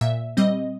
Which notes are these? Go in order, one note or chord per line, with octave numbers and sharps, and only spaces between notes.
A#2 E5
G3 C4 D#5